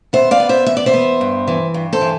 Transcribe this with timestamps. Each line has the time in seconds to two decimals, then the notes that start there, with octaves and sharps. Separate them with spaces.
0.13 B3 C5 E5
0.31 D5 F5
0.40 B3
0.49 C5 E5
0.66 E2 E5
0.77 D5
0.86 C5 E5
0.93 B3
1.21 G2
1.48 E3
1.74 G2
1.93 A4 C5
2.01 E3